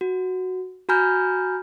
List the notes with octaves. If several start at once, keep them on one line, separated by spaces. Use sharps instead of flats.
F#4
F#4 G#5 A#5 B5 F6 G6